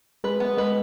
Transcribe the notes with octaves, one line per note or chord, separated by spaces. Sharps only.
G#3 B4
B3
G#3 B4